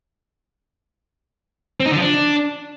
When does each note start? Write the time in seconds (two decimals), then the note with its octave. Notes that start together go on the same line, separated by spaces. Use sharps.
1.80 C4
1.85 D#4
1.91 D3
1.96 F3
2.01 D4